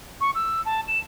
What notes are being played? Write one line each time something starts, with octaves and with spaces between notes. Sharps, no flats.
C#6
E6
A5
E7